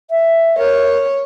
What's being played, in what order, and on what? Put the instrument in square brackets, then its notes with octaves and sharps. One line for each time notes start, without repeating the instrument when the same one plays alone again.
[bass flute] E5
[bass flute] A#4 [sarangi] C#5